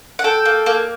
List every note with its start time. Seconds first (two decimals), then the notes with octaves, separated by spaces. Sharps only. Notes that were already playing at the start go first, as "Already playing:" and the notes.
0.19 F#5
0.24 A4 G5
0.45 A#3
0.66 A#3